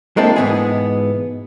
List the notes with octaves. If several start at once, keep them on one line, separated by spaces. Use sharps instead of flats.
G#3 A#3 C4 D4 E4 A4
G#2 B2 E3 G#3 B3 G#4